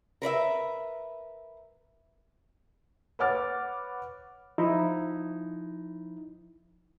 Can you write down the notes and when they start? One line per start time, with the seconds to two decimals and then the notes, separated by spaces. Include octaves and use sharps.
0.22 A#4 B4 D5 E5
3.19 B4 C#5 F#5 D6 F6 A6
4.58 F3 D#4 E4